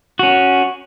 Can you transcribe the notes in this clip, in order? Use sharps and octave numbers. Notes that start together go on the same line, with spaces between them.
C#4 F#4